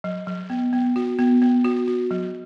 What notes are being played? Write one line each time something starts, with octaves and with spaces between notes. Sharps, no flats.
F#3
F#3
B3
B3
F#4
B3
B3
F#4
F#4
F#3